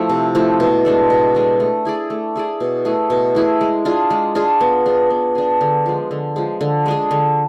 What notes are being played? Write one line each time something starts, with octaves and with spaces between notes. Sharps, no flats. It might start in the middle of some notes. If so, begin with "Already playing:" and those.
Already playing: F3 A3 E4
C3
F3 A3 E4
B2
G#3 D4 A4
B2
G#3 D4 A4
A3
E4 G#4 D5
A3
E4 G#4 D5
B2
A3 E4 G#4
B2
A3 E4 G#4
G#3
D4 F4 G#4
G#3
D4 F4 G#4
B3
D4 G#4
B3
D4 G#4
D3
F3 G#3
D3
F3 G#3
D3
G#3 D4 G#4
D3